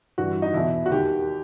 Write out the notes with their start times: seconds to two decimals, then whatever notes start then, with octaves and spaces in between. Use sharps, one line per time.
0.18 G2 E3 F#4
0.42 D#4
0.54 E2 B2 E4
0.86 F#4
0.91 D#2 D#3 G4